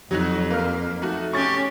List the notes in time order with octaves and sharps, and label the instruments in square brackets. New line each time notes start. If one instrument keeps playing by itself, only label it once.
[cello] F2 [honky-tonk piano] F#3 D#4 F#4
[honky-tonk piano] A#3 F6
A3 D#4 F#4
[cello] C#4 G4 [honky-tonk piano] C#6 A6